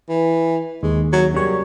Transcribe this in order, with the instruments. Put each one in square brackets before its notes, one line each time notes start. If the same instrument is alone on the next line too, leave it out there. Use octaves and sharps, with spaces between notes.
[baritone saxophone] E3
[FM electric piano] D#2 [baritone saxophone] G#3
[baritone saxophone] F#3
[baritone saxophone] F#2 [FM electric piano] C#3 G3 C#5